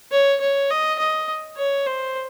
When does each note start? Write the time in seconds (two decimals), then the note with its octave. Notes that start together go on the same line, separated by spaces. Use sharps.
0.11 C#5
0.40 C#5
0.70 D#5
0.99 D#5
1.57 C#5
1.87 C5